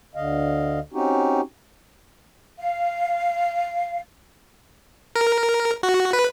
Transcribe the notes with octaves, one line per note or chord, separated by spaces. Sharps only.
D2 D3 D#5 F5
C4 C#4 D#4 F#4 G4
F5
A#4
F#4
B4